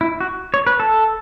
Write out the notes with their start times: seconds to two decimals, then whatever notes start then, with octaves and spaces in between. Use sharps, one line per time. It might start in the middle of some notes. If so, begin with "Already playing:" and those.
0.01 E4
0.20 F#4
0.54 C#5
0.67 B4
0.80 A4